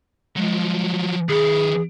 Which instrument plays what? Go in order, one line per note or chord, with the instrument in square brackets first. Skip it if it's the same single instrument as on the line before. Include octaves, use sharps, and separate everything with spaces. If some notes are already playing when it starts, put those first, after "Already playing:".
[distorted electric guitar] F3 F#3 [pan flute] G#3
[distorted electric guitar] D#3 B4 [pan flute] G#4